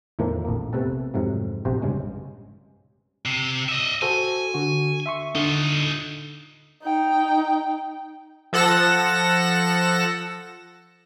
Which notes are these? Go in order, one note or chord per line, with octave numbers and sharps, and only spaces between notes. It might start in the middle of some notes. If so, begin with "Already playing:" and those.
E2 A2 D#3 F3 A#3
A#1 F2 A#3
C3 A3 B3 A4 F#5 A5
F2 G#2 C3 F#3
A#1 C3 F#4 C5
G2 C#3 G#3
C3
D#5 E5
F#4 A4 C5 G#5
D3 F#4
E5 C6 C#6
D3 D#4 F4
D#4 G5
F3 A4 F#5 A#6 E7